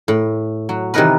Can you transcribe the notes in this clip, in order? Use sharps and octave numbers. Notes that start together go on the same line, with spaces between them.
A2
F#3
C3 D#3 E3 D#4 A#4 B4